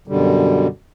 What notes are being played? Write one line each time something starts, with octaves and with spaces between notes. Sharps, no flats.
F#2 B2 D3 G3